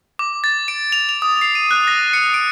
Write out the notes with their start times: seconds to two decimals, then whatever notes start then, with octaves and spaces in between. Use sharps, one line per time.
0.19 D6
0.44 A6
0.68 D7
0.92 F7
1.09 F7
1.22 D#6
1.41 C7
1.55 D#7
1.71 F#6
1.87 A#6
2.13 C#7
2.34 D7